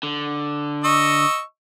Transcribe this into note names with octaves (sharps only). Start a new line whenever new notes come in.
D3
D#5 C#6 E6